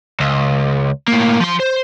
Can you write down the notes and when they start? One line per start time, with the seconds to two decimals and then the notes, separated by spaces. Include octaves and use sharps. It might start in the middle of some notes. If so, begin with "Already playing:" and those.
0.20 C#2
1.08 A2 A#3
1.40 F3 C6
1.60 C5